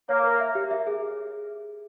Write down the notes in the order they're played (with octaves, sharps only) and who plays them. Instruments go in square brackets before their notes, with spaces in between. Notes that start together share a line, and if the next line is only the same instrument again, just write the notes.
[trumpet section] A#3 [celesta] C#5
[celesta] A#4
E5
G4
E5
G#4